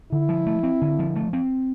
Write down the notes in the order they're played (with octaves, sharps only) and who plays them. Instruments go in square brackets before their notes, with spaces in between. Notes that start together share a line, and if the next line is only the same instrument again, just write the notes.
[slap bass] D3 [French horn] E4
[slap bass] F3
A3
C4
D3
F3
A3
C4